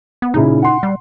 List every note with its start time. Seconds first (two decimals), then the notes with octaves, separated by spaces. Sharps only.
0.22 B3
0.34 A#2 C#3 D#4 E4
0.63 F#5 C6
0.83 G3